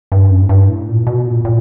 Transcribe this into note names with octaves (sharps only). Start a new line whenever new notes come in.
G2
F#2
G#2
G2
A2
A#2
B2
A#2
A#2